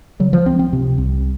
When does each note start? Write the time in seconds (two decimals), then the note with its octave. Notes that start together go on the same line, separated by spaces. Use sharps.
0.20 C#3 F#3
0.33 F3
0.45 C#2 C4
0.59 C4
0.73 C3
0.98 C2